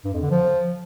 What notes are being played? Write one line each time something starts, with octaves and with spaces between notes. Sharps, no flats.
G2
F2
D3
F3